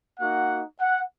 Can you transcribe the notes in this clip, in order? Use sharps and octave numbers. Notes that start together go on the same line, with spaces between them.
A#3 D#4 F#4 F#5
F#5